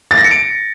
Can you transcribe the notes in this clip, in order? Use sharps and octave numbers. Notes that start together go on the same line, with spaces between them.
A6
A#6
C#7
D7